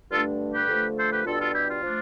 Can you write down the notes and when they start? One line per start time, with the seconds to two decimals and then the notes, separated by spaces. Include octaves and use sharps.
0.11 G2 D3 A3 D4 F4 A4
0.54 G4 B4
0.69 D3 F3 A3
0.97 A4 C5
1.11 G4 B4
1.25 B2 G3 D4 F4 A4
1.40 F4 A4
1.54 E4 G4
1.69 F4
1.82 F3 A3 D4